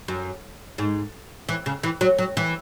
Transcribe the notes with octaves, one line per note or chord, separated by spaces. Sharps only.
F#2
G#2
E3
C#3
E3
F#3
F#3
E3